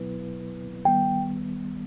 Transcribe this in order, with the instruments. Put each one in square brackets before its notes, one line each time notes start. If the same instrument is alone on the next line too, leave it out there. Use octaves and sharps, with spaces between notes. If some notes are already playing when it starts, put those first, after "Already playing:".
Already playing: [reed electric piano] B2 F#3 B3 E4 B4
[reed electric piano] D#3 G3 B3 [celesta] G5